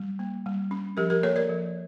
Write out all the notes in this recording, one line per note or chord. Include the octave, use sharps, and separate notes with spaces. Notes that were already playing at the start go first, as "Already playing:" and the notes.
Already playing: G3
A#3
G3
C#4
F3 G4 A#4
G4 A#4
A#3 A4 C#5
A#4 D5
F3